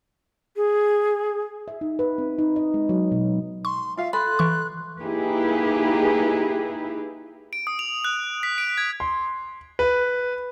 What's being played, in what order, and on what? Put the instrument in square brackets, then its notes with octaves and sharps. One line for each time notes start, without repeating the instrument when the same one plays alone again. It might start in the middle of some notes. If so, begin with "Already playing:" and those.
[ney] G#4
[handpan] E5
D#4
B4
C4
D#4
D#5
G#3
F#3
B2
[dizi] C6 [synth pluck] C#6
[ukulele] F4 F5 [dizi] E5
[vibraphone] A4 C6 [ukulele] B5 [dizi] F#6
[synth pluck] E3 C#6
[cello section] A#3 D#4 E4 G4 G#4 B4
[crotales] D7
D#6
F7
F#6
B6
D7
G#6
[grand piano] C6
B4